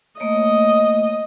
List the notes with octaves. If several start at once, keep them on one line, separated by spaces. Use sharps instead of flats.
A3 A#3 C#5 D#5